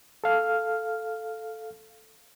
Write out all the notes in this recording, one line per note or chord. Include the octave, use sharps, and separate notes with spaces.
A4 F5 F6